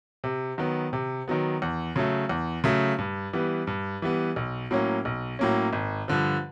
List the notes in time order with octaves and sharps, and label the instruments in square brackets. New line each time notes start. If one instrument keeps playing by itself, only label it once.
[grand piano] C3
D#3 F#3 B3
C3
D#3 F#3 B3
E2
C#3 F#3 A3
E2
C#3 F#3 A3
G2
E3 G3 B3
G2
E3 G3 B3
B1
A2 F#3 A#3 C#4
B1
A2 F#3 A#3 C#4
G#1
G2 D3 F3